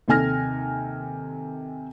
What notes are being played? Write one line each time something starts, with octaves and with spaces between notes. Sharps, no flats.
D#2 C3 A4 G#5 F6 A#6